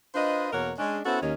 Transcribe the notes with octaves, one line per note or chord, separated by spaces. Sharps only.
D4 F4 B4 C5 D#5
E2 B2 A#3 A#4 C#5 F#5
G#3 C#4 D4
B3 C#4 E4 F#4 A4 C5
D#2 D#3 C#4